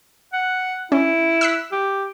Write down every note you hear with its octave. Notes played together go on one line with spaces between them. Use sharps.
F#5
C#4 E4
E6 F#6 B6
G4